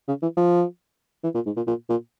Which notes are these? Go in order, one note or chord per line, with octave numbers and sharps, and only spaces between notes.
C#3
E3
F3
E3
A#2
G#2
A#2
A#2
A#2